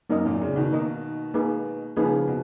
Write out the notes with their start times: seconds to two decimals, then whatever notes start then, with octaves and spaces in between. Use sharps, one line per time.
0.10 F#2 A#3 D#4 A#4 D#5
0.25 F#2 A#2
0.41 A#2 C#3
0.56 B2 D#3
0.72 A#3 D#4 A#4 D#5
1.34 A#3 D#4 G#4 B4
1.96 C#3 F3 A#3 D#4 G#4 B4
2.28 B2